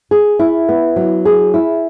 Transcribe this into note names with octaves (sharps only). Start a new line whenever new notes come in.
G#4
E4
B3
F#3
G#4
E4